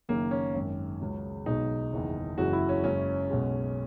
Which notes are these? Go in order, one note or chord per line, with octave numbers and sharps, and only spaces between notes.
F#1 F#2 D#3 A#3
C#4
G#1 F#2 D#3
C#2 C#3 F#3
B1 B2 G#3 D#4
F#1 E2 D#3
F#1 F#2 C#3 E3 G#3 F#4
E4
C#4
F#1 F#2 C#3 G#3 C#4
B1 B2 G#3